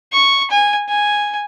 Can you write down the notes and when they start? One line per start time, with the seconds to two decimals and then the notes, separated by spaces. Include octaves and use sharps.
0.13 C#6
0.51 G#5
0.89 G#5